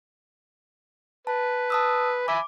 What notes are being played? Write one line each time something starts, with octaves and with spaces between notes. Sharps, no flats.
B4 A5
A5 D#6 E6
E5 G#5 B5 D6